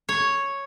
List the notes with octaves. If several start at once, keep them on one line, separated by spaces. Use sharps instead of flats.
C#5